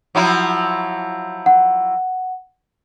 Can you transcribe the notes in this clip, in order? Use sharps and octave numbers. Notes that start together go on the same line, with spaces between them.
F3 F#3 E4
F#5